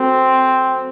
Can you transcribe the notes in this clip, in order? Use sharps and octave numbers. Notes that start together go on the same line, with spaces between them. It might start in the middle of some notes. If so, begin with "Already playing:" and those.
Already playing: F#3 A3 C4